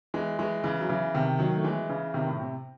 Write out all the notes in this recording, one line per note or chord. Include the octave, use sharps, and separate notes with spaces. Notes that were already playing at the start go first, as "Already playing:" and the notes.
E3 G#3
E3 G#3
C#3 E3
F#3
C#3 E3
C3 D#3
D#3 F#3
A3
E3 G#3
C#3 E3
C3 D#3
A2
C3